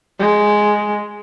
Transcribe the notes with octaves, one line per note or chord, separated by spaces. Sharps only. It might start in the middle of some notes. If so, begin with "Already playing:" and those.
G#3